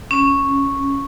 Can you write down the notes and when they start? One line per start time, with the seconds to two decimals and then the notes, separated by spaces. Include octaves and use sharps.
0.11 C#4